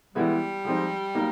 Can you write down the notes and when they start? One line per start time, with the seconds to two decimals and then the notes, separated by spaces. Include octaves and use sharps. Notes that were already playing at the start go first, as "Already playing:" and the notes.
0.15 E3 G3 G#3 B3 E4
0.65 F3 G#3 C4 D#4
1.15 F#3 A#3 D#4